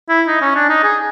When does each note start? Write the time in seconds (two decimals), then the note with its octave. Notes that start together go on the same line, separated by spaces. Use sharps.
0.09 E4
0.28 D#4
0.42 C#4
0.55 D4
0.70 D#4
0.84 G#4